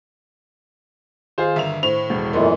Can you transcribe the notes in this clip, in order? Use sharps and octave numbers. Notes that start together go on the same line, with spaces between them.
D#3 F4 G#4 C5
G1 A#4 E5 F7
A2 C5 F7
E1
F#2 A#2 E3 A3 B3 A#4 D#5 C6